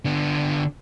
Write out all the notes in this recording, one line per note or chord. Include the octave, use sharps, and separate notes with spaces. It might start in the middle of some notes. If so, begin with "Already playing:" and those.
D3 B3